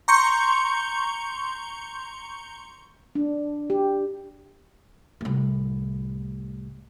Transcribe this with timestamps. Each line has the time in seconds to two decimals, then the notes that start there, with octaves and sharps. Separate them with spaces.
0.08 A#5 C6 C#6 G6 C#7
3.15 D4
3.70 G4
5.21 C2 A2